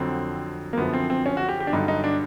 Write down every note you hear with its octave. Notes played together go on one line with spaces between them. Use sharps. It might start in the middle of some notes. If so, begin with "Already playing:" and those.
Already playing: F2 D3 F#3 C4
A#3
F#2 D3 F3 B3
C4
C4
C#4
F#4
G4
G4
D4
G2 D3 F#3 D#4
D#4
D4